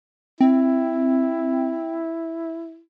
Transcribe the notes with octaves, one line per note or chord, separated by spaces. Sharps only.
C4 E4